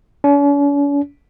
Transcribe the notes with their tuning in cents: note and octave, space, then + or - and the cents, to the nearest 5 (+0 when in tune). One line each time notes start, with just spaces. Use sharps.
C#4 +45